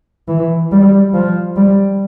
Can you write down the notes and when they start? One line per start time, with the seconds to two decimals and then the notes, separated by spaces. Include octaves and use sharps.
0.28 E3
0.71 G3
1.14 F3
1.56 G3